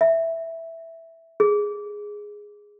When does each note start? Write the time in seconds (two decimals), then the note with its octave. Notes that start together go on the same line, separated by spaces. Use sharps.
0.01 E5
1.40 G#4